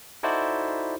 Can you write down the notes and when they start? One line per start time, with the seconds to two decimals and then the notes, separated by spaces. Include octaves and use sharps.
0.23 D#4 E4 F#4 A4 C5 D5